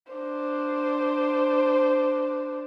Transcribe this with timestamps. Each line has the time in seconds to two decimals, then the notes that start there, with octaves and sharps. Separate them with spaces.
0.12 D4 C5